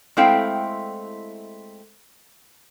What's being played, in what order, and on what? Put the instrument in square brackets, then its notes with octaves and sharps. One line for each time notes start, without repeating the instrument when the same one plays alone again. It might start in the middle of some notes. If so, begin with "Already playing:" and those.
[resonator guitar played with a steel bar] G#3 A3 C4 E4 F5 G5